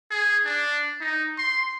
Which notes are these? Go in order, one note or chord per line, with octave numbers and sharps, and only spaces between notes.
G#4
D4
D#4
C6